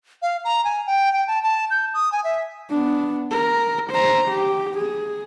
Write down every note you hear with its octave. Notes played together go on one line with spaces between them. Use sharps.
F5
A#5
G#5
G5
G5
A5
A5
G6
D#6
G#5
E5
B3 D4
A#4
C5 A#5
G4
G#4